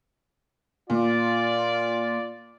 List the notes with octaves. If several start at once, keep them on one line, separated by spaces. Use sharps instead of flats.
A#2 F4 D5